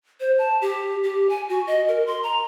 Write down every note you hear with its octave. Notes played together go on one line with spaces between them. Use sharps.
C5
A5
G4
G4
G#5
F#4
D#5
A#4
C6
A#5